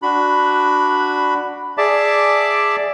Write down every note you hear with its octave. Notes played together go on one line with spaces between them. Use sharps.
D4 F#4 B5
G#4 D5 E5 A5 D6